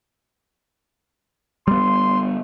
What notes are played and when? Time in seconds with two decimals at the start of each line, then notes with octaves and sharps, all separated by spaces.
1.68 G3 B3 C6